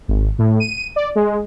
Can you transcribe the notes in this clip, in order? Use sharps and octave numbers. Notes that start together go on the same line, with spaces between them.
G#1
A2
D#7
D5
G#3